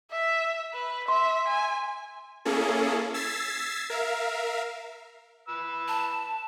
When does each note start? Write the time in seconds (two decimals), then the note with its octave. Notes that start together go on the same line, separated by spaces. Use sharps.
0.11 E5
0.74 B4
1.08 E5 C6
1.48 G#5
2.45 A#3 C#4 E4 G#4 A4
3.14 E6 G#6 A6 B6 C7
3.90 A#4 E5 F5
5.48 B4 E6
5.88 A5